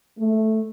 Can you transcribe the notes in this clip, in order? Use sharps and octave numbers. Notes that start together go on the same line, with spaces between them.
A3